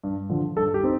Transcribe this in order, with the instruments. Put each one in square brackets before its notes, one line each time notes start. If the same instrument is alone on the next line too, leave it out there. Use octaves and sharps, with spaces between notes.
[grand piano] G2
D3 F3
G2 A4
G4
C4 D#4